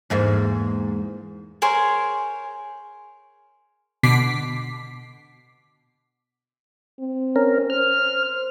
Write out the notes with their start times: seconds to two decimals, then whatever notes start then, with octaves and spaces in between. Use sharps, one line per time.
0.10 E2 G#2 A#3
1.62 G#4 A#4 C5 C#5
4.03 B2 D3 D6 B6 C7
6.99 C4
7.36 C#4 A#4
7.70 C5 F6